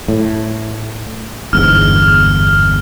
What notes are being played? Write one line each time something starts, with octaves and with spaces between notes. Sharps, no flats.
A2
G1 E2 G#2 F6